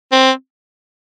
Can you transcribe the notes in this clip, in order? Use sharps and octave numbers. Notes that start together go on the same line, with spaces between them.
C4